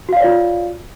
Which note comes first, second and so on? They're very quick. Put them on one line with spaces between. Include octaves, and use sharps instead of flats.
F#4 F5 D5 C#5 F4